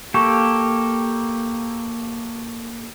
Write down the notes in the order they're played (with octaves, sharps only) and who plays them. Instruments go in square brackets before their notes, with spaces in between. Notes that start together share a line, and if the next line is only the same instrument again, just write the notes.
[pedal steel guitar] A#3 G4 A4 [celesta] C#6